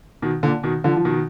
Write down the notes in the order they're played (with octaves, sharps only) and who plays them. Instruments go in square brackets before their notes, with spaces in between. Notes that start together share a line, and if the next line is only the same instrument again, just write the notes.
[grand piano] B2 D#3
A#2 D3
B2 D#3
D3 F3
F3
B2 D#3